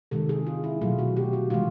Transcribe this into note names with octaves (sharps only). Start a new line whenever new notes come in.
C3 D#3 G#3 A4
G#4
F4
E4
B2 F#3 A3 F4
F#4
G4
F#4
C3 E3 G#3 F4